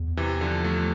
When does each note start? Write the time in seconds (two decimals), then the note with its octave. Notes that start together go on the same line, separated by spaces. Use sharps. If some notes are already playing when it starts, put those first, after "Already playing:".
Already playing: E2
0.17 C3 E3
0.41 D3 F3
0.64 F3 A3